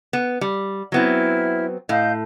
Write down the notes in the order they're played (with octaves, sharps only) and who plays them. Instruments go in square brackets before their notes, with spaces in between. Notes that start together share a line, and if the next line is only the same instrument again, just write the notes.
[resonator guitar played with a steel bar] B3
G3
[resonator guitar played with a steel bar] F#3 B3 C4 [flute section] E4 E5 F6
[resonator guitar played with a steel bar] A2 [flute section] D#5 F5 G6